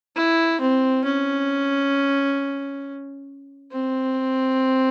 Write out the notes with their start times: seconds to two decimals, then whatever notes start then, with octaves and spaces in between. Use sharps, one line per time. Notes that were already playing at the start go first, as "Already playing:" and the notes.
0.16 E4
0.61 C4
1.05 C#4
3.72 C4